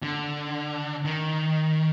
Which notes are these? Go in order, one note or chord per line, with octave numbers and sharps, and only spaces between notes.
D3
D#3